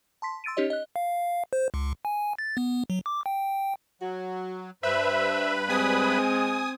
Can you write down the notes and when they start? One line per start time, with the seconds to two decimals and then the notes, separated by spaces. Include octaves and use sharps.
0.22 A5 C6 B6
0.44 C6 E6 A6 D7 D#7
0.57 C#4 D#4 G4 C#5 D#5
0.70 D#5 F#6
0.96 F5
1.53 C5
1.74 C#2
2.05 G#5
2.39 A6
2.57 B3
2.90 F#3
3.06 D6
3.26 G5
4.02 F#3 F#4
4.83 G2 B4 C5 E5 B5
5.69 G#3 C4 G#5 D#6